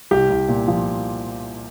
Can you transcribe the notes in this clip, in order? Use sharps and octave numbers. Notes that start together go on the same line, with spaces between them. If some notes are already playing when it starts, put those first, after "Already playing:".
C2 G4
C2
A#2
F3